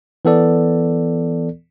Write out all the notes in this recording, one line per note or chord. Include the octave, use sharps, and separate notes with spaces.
E3 B3 A4 D5